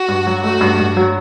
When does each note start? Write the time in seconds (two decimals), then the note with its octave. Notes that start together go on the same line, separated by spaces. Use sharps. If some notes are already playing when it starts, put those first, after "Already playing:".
Already playing: F#4
0.08 G2
0.27 F#3
0.43 A3 F#4
0.61 G2
0.80 G2
0.97 F#3